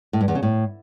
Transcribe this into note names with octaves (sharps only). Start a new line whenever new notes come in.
A2
G2
E2
C#3
A2